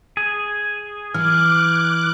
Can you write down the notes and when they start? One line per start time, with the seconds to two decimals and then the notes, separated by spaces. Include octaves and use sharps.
0.17 G#4
1.14 E3 D6 F6 F#6